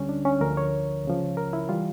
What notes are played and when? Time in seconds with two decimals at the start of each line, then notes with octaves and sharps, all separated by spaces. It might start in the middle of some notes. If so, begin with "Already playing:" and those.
Already playing: D2 D3 G3 C#4
0.09 D4
0.25 C#4
0.41 D2 D3 F3 A#4
0.57 C#5
1.05 C#2 C#3 F3
1.37 A#4
1.53 E4
1.69 E3 G3 F4